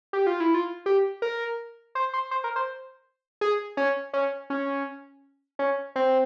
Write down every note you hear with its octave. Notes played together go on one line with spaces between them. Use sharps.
G4
F4
E4
F4
G4
A#4
C5
C5
C5
A#4
C5
G#4
C#4
C#4
C#4
C#4
C4